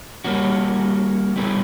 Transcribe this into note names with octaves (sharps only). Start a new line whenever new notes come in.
G3 A#3 C#4 F#4
G3 B3 E4 G#4